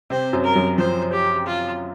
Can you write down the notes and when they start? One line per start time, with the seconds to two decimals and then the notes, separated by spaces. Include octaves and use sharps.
0.10 C3 C4 C5
0.33 F#2 F#3
0.44 A#4
0.55 F#2 F#3
0.78 F3 C5
1.12 G4
1.46 F4